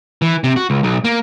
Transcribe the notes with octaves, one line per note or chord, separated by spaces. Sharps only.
E3
C3
F#4
C#2
B1
A#3